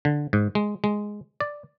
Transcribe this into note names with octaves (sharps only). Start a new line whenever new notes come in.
D3
G#2
G#3
G#3
D5